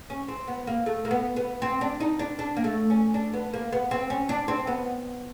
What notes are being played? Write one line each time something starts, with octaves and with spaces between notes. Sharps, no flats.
C#4
C4
B3
A#3
A3
A#3
B3
B3
C4
D4
D#4
D4
D4
A#3
A3
C#4
D4
B3
A#3
B3
C4
C#4
D4
C4
B3